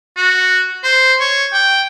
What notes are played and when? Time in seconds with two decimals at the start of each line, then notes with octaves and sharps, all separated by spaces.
0.16 F#4
0.84 C5
1.20 C#5
1.53 G5